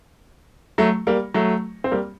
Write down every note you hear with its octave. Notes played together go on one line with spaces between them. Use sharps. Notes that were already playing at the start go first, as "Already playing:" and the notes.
F#3 A3
G3 A#3
F#3 A3
C4
G3 A#3